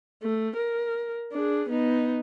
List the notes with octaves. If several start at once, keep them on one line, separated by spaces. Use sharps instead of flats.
A3
A#4
D4 G#4
B3 D#4